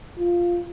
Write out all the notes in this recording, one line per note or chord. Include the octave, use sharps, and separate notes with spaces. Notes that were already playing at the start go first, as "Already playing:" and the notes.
F4